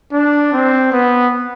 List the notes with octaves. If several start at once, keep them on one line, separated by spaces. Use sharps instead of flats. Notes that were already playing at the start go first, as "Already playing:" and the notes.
D4
C4
B3